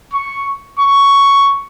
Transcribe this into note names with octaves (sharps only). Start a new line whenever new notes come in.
C#6
C#6